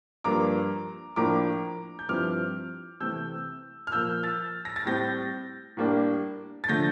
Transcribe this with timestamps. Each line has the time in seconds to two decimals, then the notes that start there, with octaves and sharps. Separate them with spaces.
0.24 G2 F3 A#3 D4 A#5 D6
1.16 A2 F3 A#3 D4 A#5 D6
1.99 G6
2.09 G2 F3 C4 E4 D6 F6
3.00 C3 E3 A3 E6 G6
3.87 F6
3.92 A#2 F3 A#3 E6 G6
4.23 F6 A6
4.65 A#6
4.76 A6
4.85 A2 G3 C4 G6 A#6
5.77 A2 G3 A#3 D4
6.64 A6
6.69 D3 F3 A3 G6 A#6